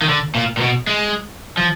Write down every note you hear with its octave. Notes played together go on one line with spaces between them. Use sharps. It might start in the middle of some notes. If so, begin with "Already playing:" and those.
D#3
D3
A#2
A#2
B2
G#3
F3